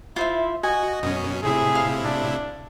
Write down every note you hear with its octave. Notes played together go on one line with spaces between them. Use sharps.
E4 F4 C5 E5
F#4 D#5 G#5
F#2 B2 C#4 D#6
A2 C3 E4 G#4
F5
D4